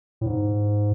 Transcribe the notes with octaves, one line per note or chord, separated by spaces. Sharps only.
A2
G#2